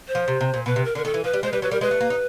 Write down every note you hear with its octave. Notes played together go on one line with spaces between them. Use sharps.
C5
F3
C3
C3
A#2
B2 B4
C3
A#4
D3 A#4
D#3 A4
E3
F3 B4
G3
G#3 C5
G3 B4
F#3 B4
G3 A#4
G#3 B4
A3
A#3
D#4